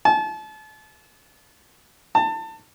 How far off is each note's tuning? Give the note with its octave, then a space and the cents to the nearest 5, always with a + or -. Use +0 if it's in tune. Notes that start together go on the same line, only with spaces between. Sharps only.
A5 -35
A5 +25